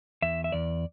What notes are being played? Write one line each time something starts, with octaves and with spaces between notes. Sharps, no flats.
E2 E5
E5
E2 D5